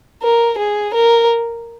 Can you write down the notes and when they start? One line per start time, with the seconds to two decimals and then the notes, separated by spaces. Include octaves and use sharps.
0.22 A#4
0.58 G#4
0.94 A#4